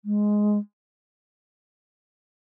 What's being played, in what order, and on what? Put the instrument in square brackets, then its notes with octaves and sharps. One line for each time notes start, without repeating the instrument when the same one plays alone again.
[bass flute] G#3